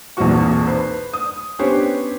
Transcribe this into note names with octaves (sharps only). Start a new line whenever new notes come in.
B1 E2 A#2 C4 F#4 C#6
B4 C5
D#6
B3 C#4 D4 G4 C5 C#5